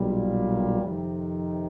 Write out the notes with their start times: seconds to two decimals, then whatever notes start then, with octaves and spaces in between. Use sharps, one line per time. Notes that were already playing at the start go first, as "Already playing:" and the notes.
Already playing: B1 A#2 G3
0.82 F2 C3 D#3